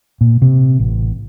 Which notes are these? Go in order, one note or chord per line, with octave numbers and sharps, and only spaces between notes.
A#2
C3
A1